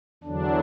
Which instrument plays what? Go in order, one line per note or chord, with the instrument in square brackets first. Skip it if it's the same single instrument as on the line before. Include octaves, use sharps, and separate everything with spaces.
[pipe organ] E2 D3 F#3 D4